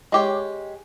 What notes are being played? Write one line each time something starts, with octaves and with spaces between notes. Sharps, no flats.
G#3 G4 C#5